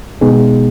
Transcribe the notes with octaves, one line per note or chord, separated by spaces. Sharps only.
B2 G#3 B3 D#4 G#4